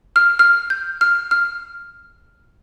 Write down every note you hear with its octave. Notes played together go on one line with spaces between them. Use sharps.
F6
F6
G6
F6
F6